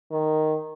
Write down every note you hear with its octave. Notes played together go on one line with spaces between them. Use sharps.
D#3